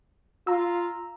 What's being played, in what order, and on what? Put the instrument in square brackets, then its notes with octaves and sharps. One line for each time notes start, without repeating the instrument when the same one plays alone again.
[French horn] F4 [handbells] A#5 E6